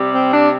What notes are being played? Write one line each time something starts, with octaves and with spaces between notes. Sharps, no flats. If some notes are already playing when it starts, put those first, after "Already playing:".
Already playing: C3 G3
C4
D4